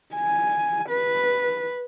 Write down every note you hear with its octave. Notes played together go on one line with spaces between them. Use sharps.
G#5
B4